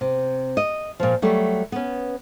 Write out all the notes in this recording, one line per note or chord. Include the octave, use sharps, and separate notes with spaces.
C3
D#5
A#2 F3
F#3 G3 A3
B3 C#4